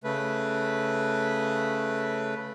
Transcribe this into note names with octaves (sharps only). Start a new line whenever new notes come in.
C#3 A3 B4